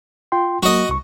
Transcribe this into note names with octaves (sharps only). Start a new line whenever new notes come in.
F4 G5 C6
F#3 A#3 F#4 D#5
C2 C#6